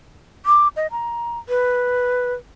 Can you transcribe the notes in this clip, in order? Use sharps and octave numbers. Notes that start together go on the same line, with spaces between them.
D6
D#5
A#5
B4